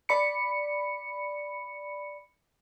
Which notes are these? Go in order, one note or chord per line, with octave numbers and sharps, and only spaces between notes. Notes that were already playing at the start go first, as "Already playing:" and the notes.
D5 B5 C#7